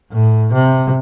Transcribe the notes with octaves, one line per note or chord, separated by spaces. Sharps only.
A2
C3